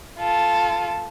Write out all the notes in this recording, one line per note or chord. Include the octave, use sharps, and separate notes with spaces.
F4 A4